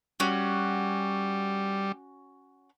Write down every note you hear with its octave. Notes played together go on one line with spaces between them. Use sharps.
G3 C#4 F#4